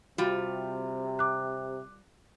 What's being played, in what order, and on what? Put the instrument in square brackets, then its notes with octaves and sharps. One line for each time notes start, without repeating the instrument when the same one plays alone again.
[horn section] C3 [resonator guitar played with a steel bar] G3 F4 [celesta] F#4
[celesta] D6 F#6